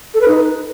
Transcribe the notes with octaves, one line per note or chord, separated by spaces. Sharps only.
A4
B4
D#4